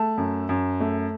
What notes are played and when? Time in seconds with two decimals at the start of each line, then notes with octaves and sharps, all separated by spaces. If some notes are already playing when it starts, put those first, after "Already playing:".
Already playing: A3 A5
0.17 F#2
0.49 F#2
0.80 A3